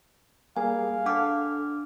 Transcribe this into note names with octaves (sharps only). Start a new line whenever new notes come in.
G3 A#3 G#4 F5 G#5
D4 A4 F#5 D6 F6